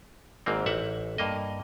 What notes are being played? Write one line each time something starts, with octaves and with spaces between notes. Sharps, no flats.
G#1 G#2 A#3 C4
A1 E5 F#5
G2 A#3 D#5